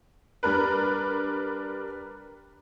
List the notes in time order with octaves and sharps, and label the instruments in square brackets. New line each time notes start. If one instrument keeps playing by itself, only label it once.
[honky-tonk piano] G3 D4 A#4 B4